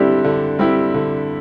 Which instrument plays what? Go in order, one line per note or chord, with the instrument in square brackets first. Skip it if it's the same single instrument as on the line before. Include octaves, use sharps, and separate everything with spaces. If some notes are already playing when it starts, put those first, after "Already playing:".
Already playing: [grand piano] D3 G3 C4 E4 G4 [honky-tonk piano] D4
[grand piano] D3
G3 C4 E4 G4
D3